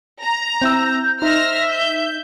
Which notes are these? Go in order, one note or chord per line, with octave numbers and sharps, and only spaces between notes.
A#5
C4 E4 E6 G6
D#4 C5 E5 F6 A#6
G6